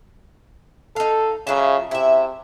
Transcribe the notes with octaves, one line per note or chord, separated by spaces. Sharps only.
D#4 A4 F5
C#3 F#3 F4 E5
C3 E4 E5